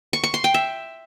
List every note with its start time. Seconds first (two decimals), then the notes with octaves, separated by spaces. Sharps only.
0.13 C#6
0.24 C#6
0.34 C6
0.44 G5
0.54 E5